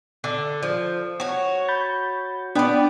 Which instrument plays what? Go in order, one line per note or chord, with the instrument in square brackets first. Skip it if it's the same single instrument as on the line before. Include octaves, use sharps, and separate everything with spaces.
[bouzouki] D3
F3
F#4 C#5
[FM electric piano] B5 G6 A6
[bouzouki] B3 D5 [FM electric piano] D4 G5 B5